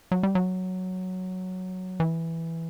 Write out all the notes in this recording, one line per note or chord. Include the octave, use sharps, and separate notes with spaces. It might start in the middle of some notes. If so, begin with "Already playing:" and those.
F#3
G3
F#3
E3